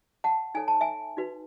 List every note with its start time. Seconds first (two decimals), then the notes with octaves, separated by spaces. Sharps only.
0.24 F#5 A5
0.55 D#4 A4 C#5 G#5
0.68 A5
0.81 E5 G#5
1.17 D#4 F#4 B4